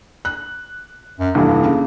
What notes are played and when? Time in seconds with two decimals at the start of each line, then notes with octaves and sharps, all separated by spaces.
0.25 F#6
1.20 F#2
1.35 F1 G2 E3 A#3
1.65 C#3